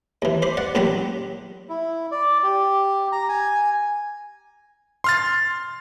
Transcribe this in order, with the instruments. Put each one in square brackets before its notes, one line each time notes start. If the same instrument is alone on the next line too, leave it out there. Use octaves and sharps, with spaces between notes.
[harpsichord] D#2 E3
C5 B5 D6
D5 F#5
A1 A#2 F#3 G4 G5 B5
[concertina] E4
D5
G4
A#5
G#5
[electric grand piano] C6 F6 A6